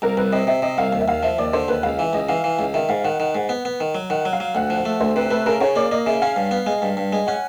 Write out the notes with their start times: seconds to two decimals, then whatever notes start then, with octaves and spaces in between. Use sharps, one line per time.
0.02 C2 A#4
0.17 C2 B4
0.32 C3 D#5
0.47 C3 E5
0.62 C3 D#5
0.78 C2 F5
0.93 D#2
1.01 E5
1.08 D#2 F5
1.23 F3 E5
1.39 D#2 D5
1.53 D3 C5
1.68 D#2 B4
1.83 C#2 F5
1.98 E3 E5
2.13 C#2 D#5
2.29 E3 F5
2.44 E3
2.59 C#2
2.74 D#3 E5
2.89 G#2 F5
3.04 D#3 F#5
3.20 D#3
3.35 G#2
3.49 B3
3.65 B3
3.80 D#3
3.95 F#3
4.10 D#3 F#5
4.25 F#3
4.33 F5
4.40 F#3
4.55 D2 F#5
4.70 F3
4.78 F#5
4.85 A3
5.00 D2 C5
5.16 C3 B4
5.31 A3 B4
5.46 C#3 A#4
5.61 C#3 C#5
5.76 A#3 D5
5.91 A#3 D#5
6.06 C#3 E5
6.22 C#4 F5
6.36 G2
6.51 B3
6.66 G#3
6.82 G2
6.97 G2
7.13 G#3
7.27 C#4 F#5